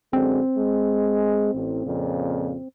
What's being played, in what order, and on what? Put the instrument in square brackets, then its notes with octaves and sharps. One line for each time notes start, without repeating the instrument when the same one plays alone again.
[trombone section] F#2 D3 G#3 [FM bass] C4
[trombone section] G#3
A1
F2 A#2 C#3